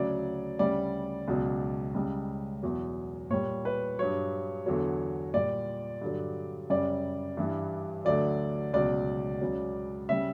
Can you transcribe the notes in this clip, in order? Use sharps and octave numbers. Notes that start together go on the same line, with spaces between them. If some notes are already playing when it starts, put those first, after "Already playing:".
Already playing: D2 C#3 F#3 D5
D2 C#3 G3 D5
C#2 B2 F#3
C#2 C#3 G3
E2 B2 F#3
A#2 G3 C#5
B4
G2 F#3 C#5
E2 D3 F#3
A#2 G3 D5
G2 D3 F#3
F#2 C#3 G3 D5
G2 E3 G3
D2 D3 F#3 D5
C#2 B2 F#3 D5
C#2 C#3 F#3
C#3 G3 E5